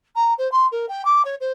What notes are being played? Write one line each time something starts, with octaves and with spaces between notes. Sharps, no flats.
A#5
C5
C6
A#4
G5
D6
C#5
C5